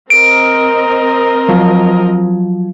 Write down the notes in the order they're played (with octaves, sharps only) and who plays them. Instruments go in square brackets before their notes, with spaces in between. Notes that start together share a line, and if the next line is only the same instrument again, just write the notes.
[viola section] C4 A#4 D#5 [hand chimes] D7
[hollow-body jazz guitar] F3 F#3